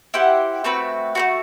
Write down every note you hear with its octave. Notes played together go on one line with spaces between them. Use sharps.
E4 G4 C5 F#5
A3 C4 F#4 B4
A3 C4 F#4